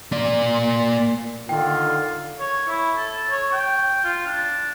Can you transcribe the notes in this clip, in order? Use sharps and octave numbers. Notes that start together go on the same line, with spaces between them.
A#3 D5
D3 D#3 F4 G5
C#5
E4
A4
C#5
G5
F4
D4